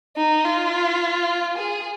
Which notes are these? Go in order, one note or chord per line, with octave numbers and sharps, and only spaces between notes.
D#4
F4
G#4